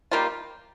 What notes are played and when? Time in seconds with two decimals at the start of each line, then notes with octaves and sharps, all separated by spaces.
0.11 D#3 G3 A#3 F4